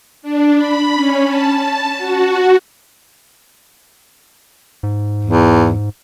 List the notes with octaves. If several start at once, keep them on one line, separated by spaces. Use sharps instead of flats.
D4
B5
C#4
A5
A5
F#4
G#2
E2